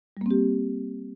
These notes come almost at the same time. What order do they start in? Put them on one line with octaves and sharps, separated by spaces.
G3 A#3 C4 G4